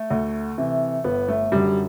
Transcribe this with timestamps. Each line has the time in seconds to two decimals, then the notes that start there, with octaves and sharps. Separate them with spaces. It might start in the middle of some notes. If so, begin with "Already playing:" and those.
Already playing: A3
0.10 D2
0.58 C3 E3
1.04 G1 B3
1.29 A3
1.52 F#2 D3 G3